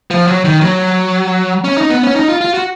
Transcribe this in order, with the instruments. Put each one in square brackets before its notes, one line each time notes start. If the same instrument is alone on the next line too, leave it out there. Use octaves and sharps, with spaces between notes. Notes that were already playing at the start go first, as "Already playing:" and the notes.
[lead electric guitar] F3
F#3
D#3
F#3
C#4
D#4
B3
C#4
D#4
F4
F4
F#4